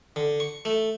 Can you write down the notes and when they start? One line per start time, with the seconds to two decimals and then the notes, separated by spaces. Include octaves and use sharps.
0.16 D3
0.40 C#6
0.65 A3